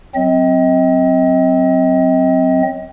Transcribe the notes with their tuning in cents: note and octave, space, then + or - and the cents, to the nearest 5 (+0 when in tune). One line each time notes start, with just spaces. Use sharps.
F#3 +0 C4 +0 D#5 +35